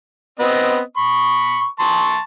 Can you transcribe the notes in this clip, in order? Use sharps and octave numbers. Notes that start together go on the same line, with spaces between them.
B3 C4 D#5
B5 C#6
A5 C6 C#6